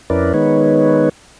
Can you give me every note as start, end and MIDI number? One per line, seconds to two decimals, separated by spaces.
0.10 0.33 41
0.10 0.33 61
0.10 0.33 64
0.10 0.33 70
0.10 0.33 71
0.10 0.33 74
0.34 1.09 51
0.34 1.09 56
0.34 1.09 59
0.34 1.09 63
0.34 1.09 71
0.34 1.09 73